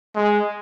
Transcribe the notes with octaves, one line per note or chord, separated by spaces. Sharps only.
G#3